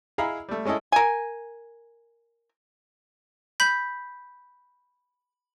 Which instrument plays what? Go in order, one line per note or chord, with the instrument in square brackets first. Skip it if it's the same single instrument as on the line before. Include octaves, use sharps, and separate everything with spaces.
[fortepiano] E4 G#4 D#5 F5 A#5 B5
G3 A3
G#3 C#4 E4 A4 D#5
[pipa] A#4 G#5
[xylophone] B5 G6 B6